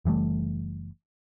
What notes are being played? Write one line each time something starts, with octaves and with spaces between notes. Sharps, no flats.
F#1 E3 G3 A3